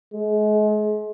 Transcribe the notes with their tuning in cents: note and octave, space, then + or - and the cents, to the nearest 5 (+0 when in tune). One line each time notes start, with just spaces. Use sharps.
G#3 +35